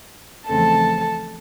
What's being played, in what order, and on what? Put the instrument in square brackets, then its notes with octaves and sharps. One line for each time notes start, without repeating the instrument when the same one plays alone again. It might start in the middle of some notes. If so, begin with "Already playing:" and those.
[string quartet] E2 C#3 F3 A3 C4 A4 A5